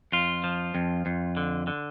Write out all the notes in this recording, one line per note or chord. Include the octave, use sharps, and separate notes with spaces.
F2 F4
F3
F2
F2
D3
D3